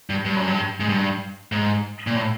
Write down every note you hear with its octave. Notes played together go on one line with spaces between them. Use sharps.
G2
G2
F#2
G2
G#2
G2
G#2
A#2
A2